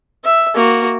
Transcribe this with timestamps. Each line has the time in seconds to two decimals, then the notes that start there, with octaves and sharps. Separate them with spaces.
0.24 E5
0.55 A#3 F#4